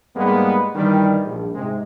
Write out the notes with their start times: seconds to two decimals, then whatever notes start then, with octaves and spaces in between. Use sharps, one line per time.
0.16 G#2 G3 G#3 A#3 B3
0.75 G2 D#3 E3 G3
1.24 A#1
1.55 G#2 C3 G#3